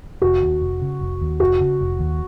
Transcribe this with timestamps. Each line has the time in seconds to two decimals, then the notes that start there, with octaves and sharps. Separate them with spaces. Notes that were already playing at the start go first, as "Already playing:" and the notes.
0.22 F1 F#4
0.42 D#2
0.61 F1
0.82 C#3
1.01 F1
1.21 D#2
1.40 F1 F#4
1.60 C#3
1.81 F1
1.99 D#2